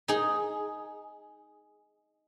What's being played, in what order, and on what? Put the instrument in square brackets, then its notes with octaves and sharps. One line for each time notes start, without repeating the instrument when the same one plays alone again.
[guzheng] D#4 G#4